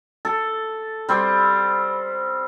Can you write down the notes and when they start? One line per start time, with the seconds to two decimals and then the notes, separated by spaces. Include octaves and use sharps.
0.25 A4
1.09 G3 C4